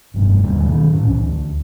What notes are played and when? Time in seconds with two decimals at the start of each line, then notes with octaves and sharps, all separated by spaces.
0.14 F1 G2 B2
0.44 D#2 D3 G3 A#3
0.66 B2 D#3
0.92 A2 C#4
1.07 C2 E3
1.20 D2